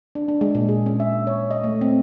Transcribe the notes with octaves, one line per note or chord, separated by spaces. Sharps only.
D4
D4
G#3
A#2
G#4
C#4
E5
C#5
D#5
A3
C4